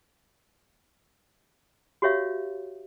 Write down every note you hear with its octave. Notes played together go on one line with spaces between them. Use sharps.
F#4 G4 C#5 E5 F5